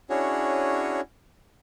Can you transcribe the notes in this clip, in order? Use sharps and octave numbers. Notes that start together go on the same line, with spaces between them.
C#4 D4 E4 F#4 G#4 C#5